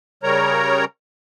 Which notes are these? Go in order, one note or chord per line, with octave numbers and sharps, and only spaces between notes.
C#3 G3 A#4 C#5 A#5